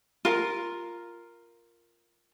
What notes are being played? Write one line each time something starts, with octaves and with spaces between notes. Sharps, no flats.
F4 A#4